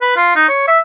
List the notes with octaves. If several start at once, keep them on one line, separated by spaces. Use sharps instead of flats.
B4
F4
D#4
C#5
E5